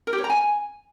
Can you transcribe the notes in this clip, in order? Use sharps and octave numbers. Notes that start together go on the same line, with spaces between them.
A#4
G4
C#5
A#5
G#5